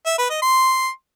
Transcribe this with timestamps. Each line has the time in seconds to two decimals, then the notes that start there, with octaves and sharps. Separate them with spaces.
0.06 E5
0.18 B4
0.30 D#5
0.42 C6